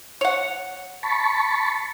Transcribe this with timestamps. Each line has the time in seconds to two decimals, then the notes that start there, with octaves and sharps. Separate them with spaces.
0.21 C#5 F#5
1.03 A5 B5 C#6